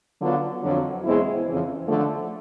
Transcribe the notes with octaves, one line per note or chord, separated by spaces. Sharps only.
D3 F#3 B3 D4 F4
F2 D3 F#3
E2 B2 G#3 C4 E4
F2 C#3 E3
D3 F3 A3